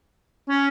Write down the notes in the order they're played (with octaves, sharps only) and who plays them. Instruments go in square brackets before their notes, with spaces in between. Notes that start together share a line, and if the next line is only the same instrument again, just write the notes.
[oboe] C#4